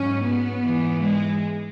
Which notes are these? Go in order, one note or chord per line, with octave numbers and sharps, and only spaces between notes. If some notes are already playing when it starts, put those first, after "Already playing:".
Already playing: G#2 F#3 C#4
B3
G#2 E3
G#3